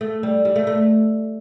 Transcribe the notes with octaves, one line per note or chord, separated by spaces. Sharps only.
A3
G3
G3
A3
A3